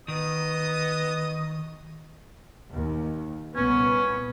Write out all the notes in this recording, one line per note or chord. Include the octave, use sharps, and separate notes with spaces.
D#3 B3 D#5 D#6
D#2
C2 A#2 B3 C#4